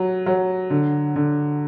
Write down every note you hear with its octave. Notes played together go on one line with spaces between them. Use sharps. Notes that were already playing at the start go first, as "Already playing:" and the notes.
Already playing: F#3
F#3
D3
D3